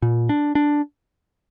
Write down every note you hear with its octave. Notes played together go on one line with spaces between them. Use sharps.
A#2
D4
D4